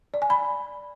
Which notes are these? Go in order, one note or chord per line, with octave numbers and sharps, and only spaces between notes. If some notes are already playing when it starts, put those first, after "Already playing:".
D5
G#5
B5